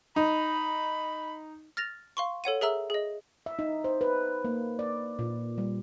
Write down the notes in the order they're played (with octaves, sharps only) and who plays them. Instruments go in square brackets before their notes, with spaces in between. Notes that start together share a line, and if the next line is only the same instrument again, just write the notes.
[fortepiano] D#4 [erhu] B5
[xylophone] F6 A6 A#6 F7
F5 C6 C#6
A4 C#5 F#5 D#7
G#4 A#4 E5 A#5 E6
G#4 D#5
[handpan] E5
D#4
C5
B4
A#3
D5
A#2
G3